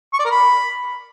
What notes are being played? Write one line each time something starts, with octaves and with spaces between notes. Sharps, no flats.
C#6
D5
A#4
B5